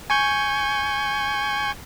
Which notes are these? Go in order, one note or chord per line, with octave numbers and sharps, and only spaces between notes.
G#5 C#6 G6